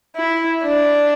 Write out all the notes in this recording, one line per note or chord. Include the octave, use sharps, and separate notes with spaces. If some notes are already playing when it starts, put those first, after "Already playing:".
E4
D4